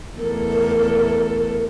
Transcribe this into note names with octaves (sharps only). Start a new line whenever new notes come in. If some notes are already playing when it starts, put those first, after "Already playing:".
E2 A3 A4 A#4